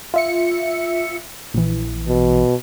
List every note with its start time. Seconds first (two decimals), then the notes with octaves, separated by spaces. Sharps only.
0.14 F4 E5 C#7
1.54 A#1 E3
2.08 B2